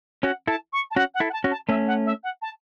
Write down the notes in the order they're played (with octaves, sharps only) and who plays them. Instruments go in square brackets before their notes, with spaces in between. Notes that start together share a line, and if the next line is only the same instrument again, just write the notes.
[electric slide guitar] C#4 F#4 [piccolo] F#5
[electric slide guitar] E4 A4 [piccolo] A5
[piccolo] C#6
A5
[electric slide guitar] C#4 F#4 [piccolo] F#5
[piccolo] F#5
[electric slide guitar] E4 A4
[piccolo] F#5
A5
[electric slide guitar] C#4 F#4
[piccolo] A5
[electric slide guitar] A3 C#4 [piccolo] E5
[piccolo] F#5
E5
F#5
A5